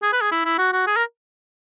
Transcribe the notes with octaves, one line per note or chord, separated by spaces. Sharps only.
G#4
B4
G#4
E4
E4
F#4
F#4
G#4
A#4